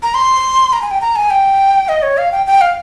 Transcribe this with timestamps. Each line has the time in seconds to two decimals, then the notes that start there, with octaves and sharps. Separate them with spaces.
0.03 A#5
0.14 C6
0.73 A#5
0.82 G#5
0.91 G5
1.01 A#5
1.16 G#5
1.31 G5
1.89 D#5
2.03 C#5
2.18 F5
2.32 G5
2.46 G5
2.61 F5